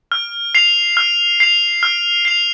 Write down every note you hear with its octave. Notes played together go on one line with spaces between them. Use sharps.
F6
C7 F7
F6
C7 F7
F6
C7 F7